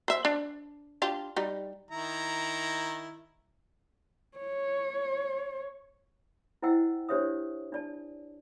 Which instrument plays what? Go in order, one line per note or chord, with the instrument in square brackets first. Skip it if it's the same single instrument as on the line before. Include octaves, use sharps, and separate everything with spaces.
[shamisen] C5 E5
D4
D4 F4 G4
G3 D#4
[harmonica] D#3 E4 A#5
[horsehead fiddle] C#5
[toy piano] E4 C5 D#5 F#5 G5 E6
D4 G4 C5 C#5 E5 D#6
D4 D5 A5